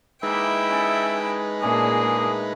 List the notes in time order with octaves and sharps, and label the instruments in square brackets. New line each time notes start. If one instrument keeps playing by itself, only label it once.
[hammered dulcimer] E3 A#3 [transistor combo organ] G#3 D#4 B4 [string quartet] E4 G5 [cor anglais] E5
[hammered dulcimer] C#4 A4
[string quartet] A#2 A#3 [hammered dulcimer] A3 C#4 D4 [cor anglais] G#4